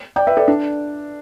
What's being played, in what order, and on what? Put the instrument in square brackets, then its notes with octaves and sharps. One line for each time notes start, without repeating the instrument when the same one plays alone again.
[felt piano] D5 G5
B4 E5
A4 D5
D4